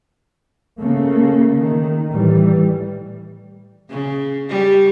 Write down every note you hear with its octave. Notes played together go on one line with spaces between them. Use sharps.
C#3 A3 A#3
D#3
A2 E3 G3
C#3
G3